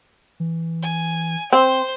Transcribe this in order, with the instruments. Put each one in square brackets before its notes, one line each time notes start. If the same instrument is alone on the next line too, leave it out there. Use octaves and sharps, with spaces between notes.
[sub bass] E3
[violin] G#5
[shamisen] C4 [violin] C5